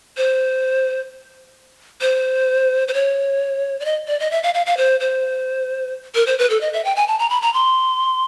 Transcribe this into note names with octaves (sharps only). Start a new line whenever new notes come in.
C5
C5
C5
C#5
D5
D#5
D5
D#5
E5
F5
F5
F5
C5
C5
A#4
C5
B4
A4
D#5
E5
G5
G#5
A5
A#5
B5
A#5
C6